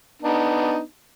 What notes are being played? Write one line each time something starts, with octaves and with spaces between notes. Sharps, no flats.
B3 D4 D#4